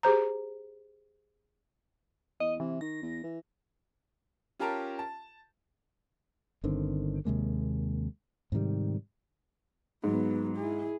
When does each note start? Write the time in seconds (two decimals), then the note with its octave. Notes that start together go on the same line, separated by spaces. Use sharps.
0.03 G4 G#4 C5 A#5
2.40 E2 D#5
2.60 C3 E3
2.81 D#3 A#6
3.02 E2
3.23 E3
4.59 C#4 F4 G4 A#4 A5 A#5
4.99 A5
6.64 G1 D3 D#3 C4
7.25 D#2 C3 G#3 A#3
8.52 G#2 C3 D#3 G3
10.04 G#2 F#3 B3
10.56 E4 G#4